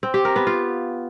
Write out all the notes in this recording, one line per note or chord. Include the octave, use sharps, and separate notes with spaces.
C4
G4
A#4
B3
F4